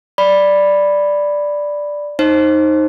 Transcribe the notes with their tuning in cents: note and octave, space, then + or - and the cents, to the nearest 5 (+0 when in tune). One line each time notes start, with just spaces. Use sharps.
D5 +0 B5 +0
D#4 +0 C5 +20